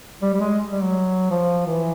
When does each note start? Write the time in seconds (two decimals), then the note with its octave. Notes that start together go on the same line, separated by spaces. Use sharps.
0.22 G3
0.34 G3
0.41 G#3
0.71 G3
0.83 F#3
1.31 F3
1.67 E3